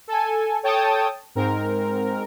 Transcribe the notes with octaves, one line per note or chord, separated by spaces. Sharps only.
A4 G#5
A4 C#5 G5 A5 D#6
G#2 C4 A#4